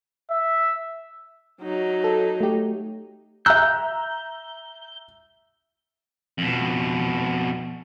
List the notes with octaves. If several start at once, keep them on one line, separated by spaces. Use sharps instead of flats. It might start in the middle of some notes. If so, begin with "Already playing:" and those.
E5
F#3 D#4
A4
A3 G4
E5 A#5 E6 F#6 G6
F2 B2